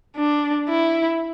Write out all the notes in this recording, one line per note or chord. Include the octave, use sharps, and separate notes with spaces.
D4
E4